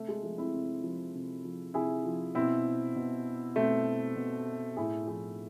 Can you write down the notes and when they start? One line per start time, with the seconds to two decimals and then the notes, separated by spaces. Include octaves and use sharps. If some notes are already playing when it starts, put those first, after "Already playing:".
Already playing: C3 A3
0.09 G#3
0.23 F3 A3
0.38 C4 E4
0.54 C3
0.83 F3
1.15 C3
1.45 F3
1.74 C3 E4 G#4
2.05 F3
2.35 B2 C4 E4
2.96 B2
3.56 B2 A3 C4
4.16 B2
4.77 A2 E4 G#4
5.07 F3 E4 G#4